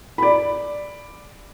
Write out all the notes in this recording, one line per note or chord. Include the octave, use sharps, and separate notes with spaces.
D5 B5